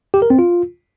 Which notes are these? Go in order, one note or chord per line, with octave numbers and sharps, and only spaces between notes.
G4
A#4
C4
F4